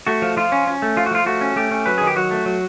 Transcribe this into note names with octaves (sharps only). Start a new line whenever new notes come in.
A3 F#4
F3
F3 F4
C#4
C#4
A3
F3 F4
F#4
F3 F4
A3 F#4
C#4
A3 G4
C#4
F#3 B4
D#3 G#4
G4
F#3 F#4
A3
F#3